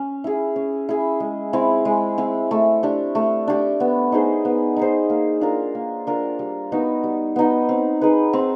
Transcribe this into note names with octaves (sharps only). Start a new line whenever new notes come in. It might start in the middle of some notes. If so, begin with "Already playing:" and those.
Already playing: C#4
E4 G#4
C#4
E4 G#4
G#3
C4 E4
G#3
C4 E4
A3
D4 G4
A3
D4 G4
B3
D#4 G#4 C5
B3
D#4 G#4 C5
A#3
D4 F4 A#4
A#3
D4 F4 A#4
G3
B3 D#4 F#4
G3
B3 D#4 F#4
C4
D#4 G#4 B4
C4